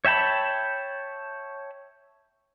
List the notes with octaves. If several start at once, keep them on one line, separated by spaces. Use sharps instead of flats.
C#5 E5 G5 A5 B5